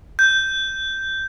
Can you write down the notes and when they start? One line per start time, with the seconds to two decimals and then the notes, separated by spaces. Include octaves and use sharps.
0.19 G6